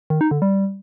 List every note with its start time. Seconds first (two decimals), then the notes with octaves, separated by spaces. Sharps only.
0.10 D#3
0.21 D#4
0.31 D3
0.42 G3